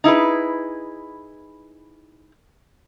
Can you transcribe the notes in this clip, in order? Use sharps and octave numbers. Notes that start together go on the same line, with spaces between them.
D#4 E4 G#4 B4